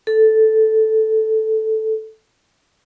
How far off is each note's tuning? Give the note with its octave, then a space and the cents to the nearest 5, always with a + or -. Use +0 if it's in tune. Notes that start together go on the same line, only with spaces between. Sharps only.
A4 -5